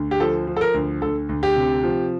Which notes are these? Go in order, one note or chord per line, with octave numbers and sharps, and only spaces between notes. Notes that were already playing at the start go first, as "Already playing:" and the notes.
Already playing: D2
G4
F3 A4
F3
A4
A#4
D2
D2 A4
D2
G4
C3
F3